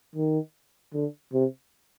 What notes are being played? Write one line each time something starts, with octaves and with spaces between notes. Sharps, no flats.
D#3
D3
C3